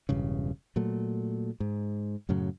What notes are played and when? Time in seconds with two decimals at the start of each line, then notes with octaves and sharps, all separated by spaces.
0.09 E1 G2 C#3
0.76 A#2 F#3 A3
1.60 G#2
2.29 F#2 A2 C#3 F#3